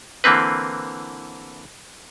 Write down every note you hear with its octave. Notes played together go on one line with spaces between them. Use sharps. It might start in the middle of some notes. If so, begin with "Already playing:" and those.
D3 E3 A#3 C4 B4